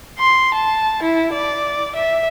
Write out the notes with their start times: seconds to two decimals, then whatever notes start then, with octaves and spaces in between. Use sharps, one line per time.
0.19 C6
0.55 A5
1.03 E4
1.33 D5
1.95 E5